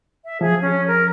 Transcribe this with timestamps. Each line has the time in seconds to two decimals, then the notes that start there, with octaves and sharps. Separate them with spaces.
0.25 E5
0.41 F3 G#4
0.62 C#4
0.87 A#4